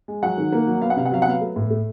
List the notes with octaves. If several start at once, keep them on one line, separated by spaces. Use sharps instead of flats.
G#3
F#3 F#5
D#3
A#3
F#3
B3 F5
F#5
C3 F5
F#5
F#3 F5
F#5
B3 F5
A3
A2
A3